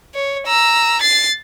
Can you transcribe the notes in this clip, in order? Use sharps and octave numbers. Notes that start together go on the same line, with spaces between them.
C#5
A#5 E6
A6 C7